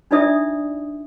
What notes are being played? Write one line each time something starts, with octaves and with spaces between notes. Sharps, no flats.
D4 D#4 F4 D5 E5 D#6